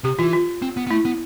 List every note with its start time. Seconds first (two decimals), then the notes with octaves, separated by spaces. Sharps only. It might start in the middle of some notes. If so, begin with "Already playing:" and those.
0.04 C3 G4
0.19 E3 F4
0.33 F4
0.62 C4
0.77 B3
0.87 B3
0.90 A3 E4
1.05 B3